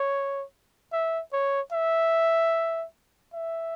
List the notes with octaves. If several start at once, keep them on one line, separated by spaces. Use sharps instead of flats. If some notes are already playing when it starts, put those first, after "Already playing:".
Already playing: C#5
E5
C#5
E5
E5